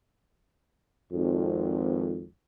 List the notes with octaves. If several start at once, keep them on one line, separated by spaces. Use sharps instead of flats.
G#1 F2